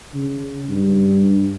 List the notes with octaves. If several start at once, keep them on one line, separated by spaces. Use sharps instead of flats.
C#3
G2